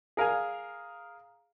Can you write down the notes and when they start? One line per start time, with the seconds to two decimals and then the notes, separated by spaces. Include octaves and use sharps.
0.17 G#4 A#4 F5 G#5